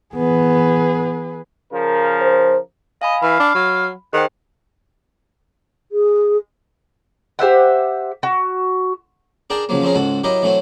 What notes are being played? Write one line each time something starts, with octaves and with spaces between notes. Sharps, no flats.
E3 B3 G#4 B4
C#3 F3 A#4
C5
D#5 F5 G#5 B5
E3 F5 B5
D4
F#3
D#3 G#4 C5 F#5 G5
G#4
G4 C5 E5 F#5
F#4
D4 G#4 A#4 G5 A5
C#3 F3 F#3 A#3
F3 C4 C#4 G#4 A#4
C#2 G#2 F#4 A4
F#3 E4 G4 A#4 D#5
E3 F#3 A3 C4 F#4